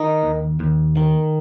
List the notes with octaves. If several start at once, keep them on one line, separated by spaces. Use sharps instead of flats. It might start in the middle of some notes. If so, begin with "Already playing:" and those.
Already playing: D#3 D#4
D#2
D#2
D#3